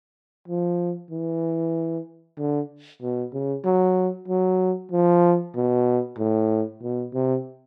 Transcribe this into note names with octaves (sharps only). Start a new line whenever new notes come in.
F3
E3
D3
B2
C#3
F#3
F#3
F3
B2
A2
B2
C3